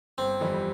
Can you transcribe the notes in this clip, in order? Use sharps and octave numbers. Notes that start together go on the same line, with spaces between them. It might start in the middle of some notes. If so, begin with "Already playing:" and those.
G1 C4
F2 E3 G3